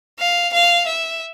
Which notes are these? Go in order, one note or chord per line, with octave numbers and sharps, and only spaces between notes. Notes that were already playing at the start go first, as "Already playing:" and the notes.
F5
F5
E5